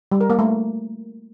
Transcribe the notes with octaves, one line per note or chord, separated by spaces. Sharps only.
G3
A#4
A#3
A3